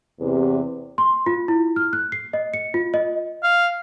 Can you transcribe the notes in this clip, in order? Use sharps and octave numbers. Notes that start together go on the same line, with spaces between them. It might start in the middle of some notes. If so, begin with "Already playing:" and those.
E2 C3
C6
F4
E4
F6
F#6
C7
D#5
C#7
F4
D#5
F5